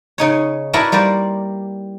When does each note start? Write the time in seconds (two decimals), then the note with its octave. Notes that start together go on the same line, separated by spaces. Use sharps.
0.18 C#3 D#4 C#5
0.73 B3 E4 F#4 A#4 D5 A5
0.92 G3 A#3 C5 D5